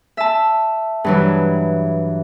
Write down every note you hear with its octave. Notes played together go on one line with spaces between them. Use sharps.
E5 A5
G2 E3 F#3